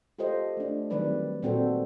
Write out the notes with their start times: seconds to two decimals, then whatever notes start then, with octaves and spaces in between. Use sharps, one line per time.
0.19 F4 G4 A4 C5 D#5
0.57 A3 D4
0.90 D#3 F#3 G3 C4 B4 D5
1.43 A#2 G3 C4 F#4 A4 C5